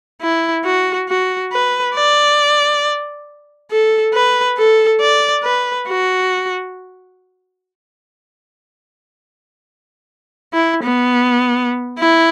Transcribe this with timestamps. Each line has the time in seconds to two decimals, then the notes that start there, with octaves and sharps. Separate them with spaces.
0.21 E4
0.64 F#4
1.09 F#4
1.52 B4
1.95 D5
3.71 A4
4.14 B4
4.58 A4
5.00 D5
5.44 B4
5.88 F#4
10.54 E4
10.84 B3
11.99 E4